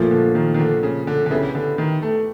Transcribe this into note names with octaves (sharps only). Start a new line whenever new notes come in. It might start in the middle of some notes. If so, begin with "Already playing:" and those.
Already playing: A#2 F3 A3
D3
D#3
D#3
D3
C#3
D3
D3
C#3 B3 E4 G4 B4
D3
D#3
A3